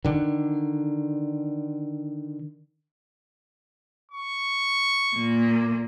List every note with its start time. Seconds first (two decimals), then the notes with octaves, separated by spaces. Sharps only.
0.05 D3 D#3
4.12 C#6
5.16 A#2 A#3